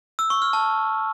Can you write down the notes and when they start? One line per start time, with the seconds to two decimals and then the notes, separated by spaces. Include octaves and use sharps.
0.19 E6
0.30 C#6
0.42 F6
0.53 A5